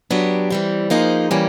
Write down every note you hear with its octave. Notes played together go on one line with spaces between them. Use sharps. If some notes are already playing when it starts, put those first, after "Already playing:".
F#3 B3 D4 G4
E3 G3 C4
F3 A#3 D#4 G#4 C5
E3 G3 A#3 C#4